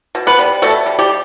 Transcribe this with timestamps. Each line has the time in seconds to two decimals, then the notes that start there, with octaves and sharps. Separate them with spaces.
0.15 B2
0.27 B3 B4
0.39 G3
0.62 B2 A3 A4
0.86 G3
0.99 G3 G4